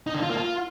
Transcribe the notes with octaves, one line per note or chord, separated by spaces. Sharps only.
D#4
D3
F4
A#3
F4